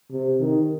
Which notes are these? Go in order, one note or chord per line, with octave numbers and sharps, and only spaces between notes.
C3
D#3